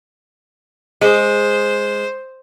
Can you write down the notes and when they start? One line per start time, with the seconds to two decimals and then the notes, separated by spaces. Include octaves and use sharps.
1.01 G#3 C5